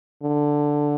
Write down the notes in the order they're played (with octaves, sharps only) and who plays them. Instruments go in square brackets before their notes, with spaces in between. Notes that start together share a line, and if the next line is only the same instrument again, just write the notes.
[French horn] D3